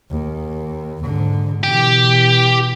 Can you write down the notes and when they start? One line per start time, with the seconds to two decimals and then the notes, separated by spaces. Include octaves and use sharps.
0.11 D#2
1.03 G#2 D3
1.63 B2 E3 G4